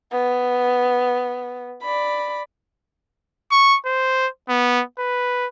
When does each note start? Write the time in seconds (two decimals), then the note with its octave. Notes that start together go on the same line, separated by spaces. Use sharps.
0.12 B3
1.82 D5 B5
3.51 C#6
3.86 C5
4.49 B3
4.99 B4